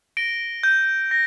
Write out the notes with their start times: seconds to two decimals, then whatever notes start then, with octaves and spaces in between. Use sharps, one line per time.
0.17 A#6 D7 G7
0.63 G6
1.11 A#6